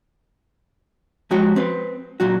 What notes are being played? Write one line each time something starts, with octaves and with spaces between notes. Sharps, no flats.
F3 G#3 F#4 G4 C#5
C4 B4
A#2 F#3 F#4